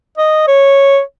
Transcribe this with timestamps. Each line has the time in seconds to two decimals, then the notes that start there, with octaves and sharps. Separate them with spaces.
0.18 D#5
0.48 C#5